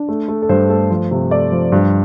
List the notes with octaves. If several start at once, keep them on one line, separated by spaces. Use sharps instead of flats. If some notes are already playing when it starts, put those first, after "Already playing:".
Already playing: D4
A3
A3
A4
G2 C5
A3 A4
F3
C3
A3 D5
F3
G2